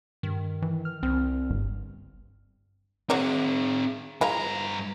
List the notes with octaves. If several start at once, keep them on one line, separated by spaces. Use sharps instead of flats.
G2 D#3
E3
F6
C2 C4
G1 G2
F#3 C4 G#4 C#5 D5
G2 F3 G#3 E4 A#5